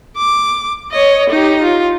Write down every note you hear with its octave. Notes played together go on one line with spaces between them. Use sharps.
D6
C#5 D#5
D#4 G4
F4